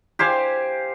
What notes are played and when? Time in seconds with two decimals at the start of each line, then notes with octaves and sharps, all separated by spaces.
0.19 G4 C5 F5 G#5